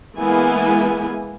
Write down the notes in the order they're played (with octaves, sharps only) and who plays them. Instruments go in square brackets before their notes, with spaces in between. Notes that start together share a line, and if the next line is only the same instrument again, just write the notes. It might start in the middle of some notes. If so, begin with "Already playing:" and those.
[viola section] E3 G#3 A#3 B3 E4 G#5